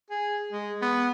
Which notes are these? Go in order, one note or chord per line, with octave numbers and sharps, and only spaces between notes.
G#4
G#3
B3